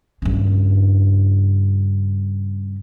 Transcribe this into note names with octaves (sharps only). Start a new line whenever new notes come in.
G2 C#3